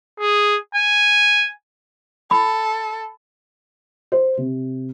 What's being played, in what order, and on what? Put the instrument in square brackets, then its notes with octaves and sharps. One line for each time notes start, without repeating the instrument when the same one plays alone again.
[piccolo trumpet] G#4
G#5
[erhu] A4 [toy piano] B5
[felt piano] C5
C3